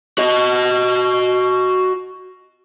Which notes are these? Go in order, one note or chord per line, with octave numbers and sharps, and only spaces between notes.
F#4 D#5